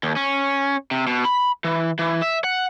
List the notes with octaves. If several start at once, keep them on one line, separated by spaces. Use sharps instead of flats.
D#2
C#4
C3
B2
B5
E3
E3
E5
F#5